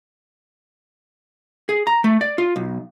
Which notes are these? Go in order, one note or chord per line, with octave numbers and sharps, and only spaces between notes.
G#4
A#5
A3
D5
F4
B1